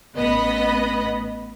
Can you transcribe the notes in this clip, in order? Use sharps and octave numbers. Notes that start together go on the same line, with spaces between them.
A1 B3 D#5 B5